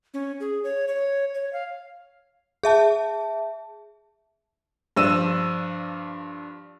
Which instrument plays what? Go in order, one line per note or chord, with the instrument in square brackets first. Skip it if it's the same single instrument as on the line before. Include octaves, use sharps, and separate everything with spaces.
[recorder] C#4
G#4
C#5
C#5
C#5
F5
[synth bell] G#4 E5 A5
[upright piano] G2 F3 D4 E6 D#7 E7